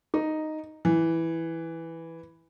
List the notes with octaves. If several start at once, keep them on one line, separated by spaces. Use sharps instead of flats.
D#4
E3